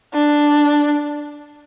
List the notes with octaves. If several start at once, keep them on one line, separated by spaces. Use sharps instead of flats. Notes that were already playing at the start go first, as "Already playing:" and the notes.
D4